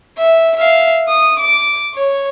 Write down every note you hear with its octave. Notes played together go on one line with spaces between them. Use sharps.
E5
E5 F5
D#6
D6
C#5